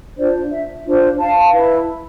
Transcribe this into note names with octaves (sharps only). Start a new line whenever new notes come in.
D4 F4 C5 D5
E5
D4 F4 C5
F5 A5
E4 B4